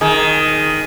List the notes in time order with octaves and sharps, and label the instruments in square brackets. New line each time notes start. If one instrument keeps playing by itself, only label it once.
[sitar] D#3 [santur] G#4